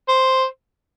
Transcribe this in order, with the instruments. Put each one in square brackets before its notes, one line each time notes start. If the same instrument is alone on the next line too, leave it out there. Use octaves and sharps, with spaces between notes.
[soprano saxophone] C5